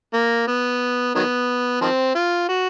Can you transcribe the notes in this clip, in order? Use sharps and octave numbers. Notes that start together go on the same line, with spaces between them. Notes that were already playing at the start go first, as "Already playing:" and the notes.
A#3
B3
D#3 F#3 B3
D#3 F3 C4
F4
F#4